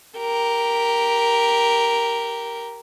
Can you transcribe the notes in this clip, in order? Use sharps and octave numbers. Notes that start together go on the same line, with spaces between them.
G4 A#4